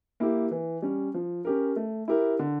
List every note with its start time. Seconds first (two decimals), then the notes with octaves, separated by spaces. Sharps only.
0.20 A#3 E4 G4
0.51 E3
0.82 G3 C#4
1.14 F3
1.45 C#4 G4 A#4
1.76 A3
2.08 E4 G4 A#4
2.39 D3